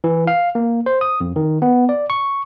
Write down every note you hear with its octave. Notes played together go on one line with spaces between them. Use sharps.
E3
F5
A#3
C5
D#6
F2
D#3
B3
D5
C#6